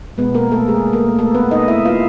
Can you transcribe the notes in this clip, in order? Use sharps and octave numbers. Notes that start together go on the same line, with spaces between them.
B2 G#3 B3 B4
A#3 A#4
A3 A4
G#3 G#4
A#3 A#4
A3 A4
B3 B4
D#4 D#5
E4 E5
F4 F5